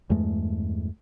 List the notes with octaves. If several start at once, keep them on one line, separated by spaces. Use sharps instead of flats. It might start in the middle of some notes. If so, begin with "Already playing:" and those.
E2 G2 G#3 A3